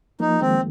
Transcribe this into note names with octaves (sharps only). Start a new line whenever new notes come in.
F3 A#3 D#4
D#3 G#3 C4